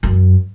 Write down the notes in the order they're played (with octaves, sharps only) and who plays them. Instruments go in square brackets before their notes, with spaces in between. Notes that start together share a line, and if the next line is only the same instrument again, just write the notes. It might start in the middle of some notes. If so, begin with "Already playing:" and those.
[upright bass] F#2